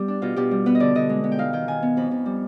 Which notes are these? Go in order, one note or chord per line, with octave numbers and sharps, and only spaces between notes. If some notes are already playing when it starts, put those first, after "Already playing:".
Already playing: G3 B3 G4
D4
B2 F4
B2 G4
G3
B3 B4
D#5
D3 D5
D3 D#5
G#3
B3
G5
D#4 F5
D#3 G5
D#3 G#5
B3
F2 B5
F2
G3